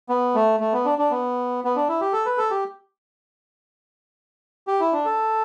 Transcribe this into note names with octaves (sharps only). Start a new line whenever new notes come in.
B3
A3
A3
B3
D4
D4
B3
B3
D4
E4
G4
A4
B4
A4
G4
G4
E4
D4
A4